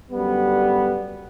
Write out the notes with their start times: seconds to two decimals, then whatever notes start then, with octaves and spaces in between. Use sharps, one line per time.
0.11 F#2 D3 G3 B3